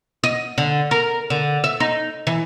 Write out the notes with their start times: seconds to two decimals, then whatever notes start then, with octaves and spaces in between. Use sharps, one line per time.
0.24 D#5
0.58 D3
0.91 A#4
1.30 D3
1.64 E5
1.80 D#4
2.27 E3